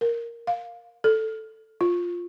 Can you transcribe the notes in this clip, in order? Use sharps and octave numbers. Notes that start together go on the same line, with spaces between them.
A#4
F5
A4
F4